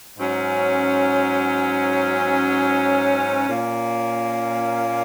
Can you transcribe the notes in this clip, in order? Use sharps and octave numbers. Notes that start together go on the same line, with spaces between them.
G#2 F#3 C#4
A#2 A#3 C#4